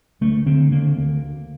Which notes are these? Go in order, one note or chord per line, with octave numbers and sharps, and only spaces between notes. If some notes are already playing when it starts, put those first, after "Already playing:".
D2 A3
D3 C4
D3 A#3
D2